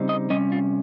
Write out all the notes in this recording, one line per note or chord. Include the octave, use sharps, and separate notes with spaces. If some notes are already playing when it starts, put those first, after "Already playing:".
Already playing: C#3 G3 C4 D#4
D#5
C3 G3 C#4 D#5
F4